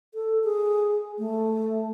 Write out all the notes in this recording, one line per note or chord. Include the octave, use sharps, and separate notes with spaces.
A4
G#4
A3